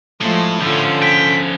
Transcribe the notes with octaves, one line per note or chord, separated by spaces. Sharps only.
A2 F3 G#3 A3
D3 F3 C#4 F4 A4
G5 B6